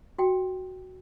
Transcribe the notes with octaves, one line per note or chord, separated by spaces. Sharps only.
F#4 G5